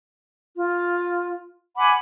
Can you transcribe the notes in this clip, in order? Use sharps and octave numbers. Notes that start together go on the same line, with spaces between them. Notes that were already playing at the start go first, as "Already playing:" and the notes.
F4
F#5 G#5 B5 D6